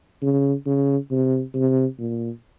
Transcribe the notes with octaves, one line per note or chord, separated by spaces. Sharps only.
C#3
C#3
C3
C3
A#2